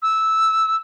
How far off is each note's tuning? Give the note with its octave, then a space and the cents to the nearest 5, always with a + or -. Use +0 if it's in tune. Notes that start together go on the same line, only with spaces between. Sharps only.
E6 -10